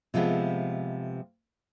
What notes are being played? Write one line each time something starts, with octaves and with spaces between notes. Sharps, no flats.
C3 F3 G#3 A3 B3